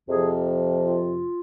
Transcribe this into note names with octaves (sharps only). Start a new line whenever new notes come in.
F2 C3 F3 G#4
F4